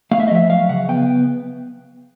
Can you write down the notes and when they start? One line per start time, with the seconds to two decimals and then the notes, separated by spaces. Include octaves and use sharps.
0.11 A3 F5
0.20 E5
0.28 D#5
0.31 F3 E5
0.50 F#3 F5
0.69 C#3 F#5
0.88 B3 G5